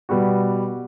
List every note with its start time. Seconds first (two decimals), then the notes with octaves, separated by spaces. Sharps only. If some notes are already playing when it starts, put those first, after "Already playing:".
0.09 B2 G3 B3 F#4